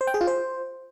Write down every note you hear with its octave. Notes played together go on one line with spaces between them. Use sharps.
C5
G5
G#4
F4
C5